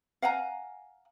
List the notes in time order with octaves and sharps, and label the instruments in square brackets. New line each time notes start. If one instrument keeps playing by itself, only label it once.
[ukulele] F5 F#5 G#5 A#5